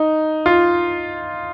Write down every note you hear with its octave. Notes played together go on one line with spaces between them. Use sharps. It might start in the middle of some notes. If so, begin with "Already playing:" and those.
Already playing: D#4
F4